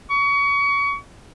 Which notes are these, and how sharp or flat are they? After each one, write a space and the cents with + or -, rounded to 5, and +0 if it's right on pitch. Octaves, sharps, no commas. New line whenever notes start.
C#6 +30